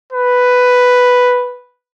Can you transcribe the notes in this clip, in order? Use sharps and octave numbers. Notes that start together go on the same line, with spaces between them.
B4